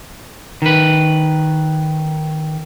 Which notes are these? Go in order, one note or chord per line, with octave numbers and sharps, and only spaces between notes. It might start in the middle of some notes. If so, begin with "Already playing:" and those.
D#3 B4